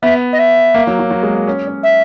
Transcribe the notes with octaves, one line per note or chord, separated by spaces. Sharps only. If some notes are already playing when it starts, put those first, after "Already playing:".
B3 E5
D#5
E5
A#3
F#3
F#3
F#3
G#3
A#3
C#4
C#4
E5